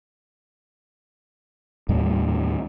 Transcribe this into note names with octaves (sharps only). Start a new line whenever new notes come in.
D#2 A2 G3